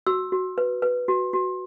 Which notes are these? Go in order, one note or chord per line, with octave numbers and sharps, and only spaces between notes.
F#4 E6
F#4
B4
B4
F#4
F#4